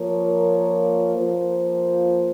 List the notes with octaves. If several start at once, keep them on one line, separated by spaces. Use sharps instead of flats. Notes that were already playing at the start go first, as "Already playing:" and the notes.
Already playing: F3 A#3 F4 A#4 C#5
F3 A#3 F4 C5